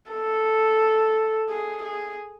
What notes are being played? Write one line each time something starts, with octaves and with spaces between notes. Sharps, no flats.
A4
G#4
G#4